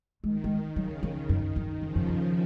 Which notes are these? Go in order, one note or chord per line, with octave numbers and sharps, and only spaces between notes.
D#3 G#3
G#3
C#3 F#3
F3
F#2 D#3
F#2
F2 C#3 F3
F#2
F2